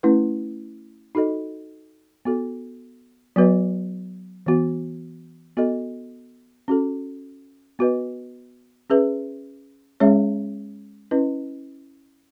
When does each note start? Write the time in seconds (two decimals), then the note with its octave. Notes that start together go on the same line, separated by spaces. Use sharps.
0.03 A3 C#4 E4 B4
1.15 D#4 F#4 A4 D#5
2.25 B3 F#4 A4
3.36 F#3 B3 F#4 B4 D#5
4.46 E3 B3 F#4
5.57 B3 F#4 A4 D#5
6.68 C#4 F#4 A4
7.79 B3 F#4 B4 D#5
8.90 C#4 G#4 B4 E5
10.00 G#3 C#4 G#4 C#5 E5
11.11 C#4 E4 B4 D#5